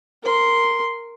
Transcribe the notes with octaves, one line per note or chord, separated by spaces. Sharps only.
A#4 C6